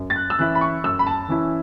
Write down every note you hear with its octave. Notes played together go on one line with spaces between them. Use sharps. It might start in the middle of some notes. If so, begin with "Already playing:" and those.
Already playing: F#2
A6
F#6
E6
E3 C#4 E4 F#6
B5
C#6
F#2 E6
B5
A5
E3 C#4 E4